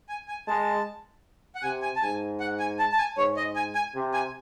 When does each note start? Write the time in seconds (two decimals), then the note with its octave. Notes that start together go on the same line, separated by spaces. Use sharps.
0.09 G#5
0.28 G#5
0.47 G#3 A5
1.55 F#5
1.63 C3 G#5
1.82 G#5
1.96 A5
2.02 G#2 G#5
2.40 F#5
2.59 G#5
2.79 A5
2.92 A5
2.98 G#5
3.17 G#2 C#5
3.37 D#5
3.56 G#5
3.75 G#5
3.94 C3
4.14 G#5